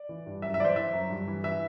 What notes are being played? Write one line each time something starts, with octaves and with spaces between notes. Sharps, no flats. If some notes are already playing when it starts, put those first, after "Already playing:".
Already playing: D5
E3
G2
F#2 E5
E5
E3 C5 D5
E3 E5
F#2
G2
E3
E3 E5